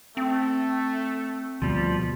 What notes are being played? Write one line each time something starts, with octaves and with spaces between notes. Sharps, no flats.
A3 C4
D2 B2 F3 G3